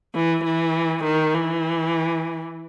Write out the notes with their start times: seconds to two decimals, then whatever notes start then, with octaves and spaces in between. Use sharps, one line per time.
0.15 E3
0.44 E3
1.04 D#3
1.34 E3